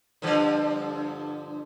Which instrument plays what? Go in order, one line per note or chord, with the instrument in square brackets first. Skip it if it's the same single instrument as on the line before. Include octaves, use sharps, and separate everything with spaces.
[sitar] G2 D3 F3